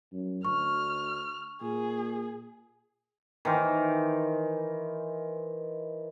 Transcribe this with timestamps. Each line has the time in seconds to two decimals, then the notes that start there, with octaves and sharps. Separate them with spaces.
0.13 F#2
0.45 D2 C#6 F6
1.61 A#2 G#4
3.45 D#3 E3 A#4 C5